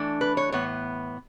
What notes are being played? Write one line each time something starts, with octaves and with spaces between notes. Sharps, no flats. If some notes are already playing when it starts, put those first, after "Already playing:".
Already playing: E3 A3 D4
B4
C#5
A2 E3 B3 C#5